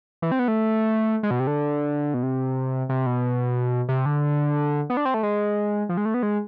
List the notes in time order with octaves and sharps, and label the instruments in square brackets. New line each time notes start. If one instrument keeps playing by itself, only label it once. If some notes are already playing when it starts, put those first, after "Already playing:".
[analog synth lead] E3
C4
B3
A3
G#3
B2
C3
D3
B2
C3
C3
B2
C3
D3
B3
D4
C4
A3
G#3
F3
G#3
A3
B3
G#3